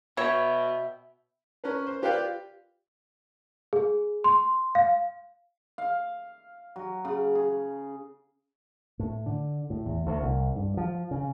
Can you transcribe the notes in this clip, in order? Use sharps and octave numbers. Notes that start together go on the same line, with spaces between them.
B2 C#5 E5 G5 B5
C#4 A#4 B4
C5
F4 G4 B4 D5 F5 G5
G#4
C6
F5
F5
F#3
C#3
G#4
A2
D3
A2
E2
D2
C2
G2
F3
C#3